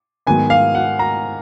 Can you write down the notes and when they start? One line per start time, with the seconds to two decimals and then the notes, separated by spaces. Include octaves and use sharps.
0.27 G#2 D#3 F#3 B3 G#5
0.50 F5
0.75 F#5
0.99 A#5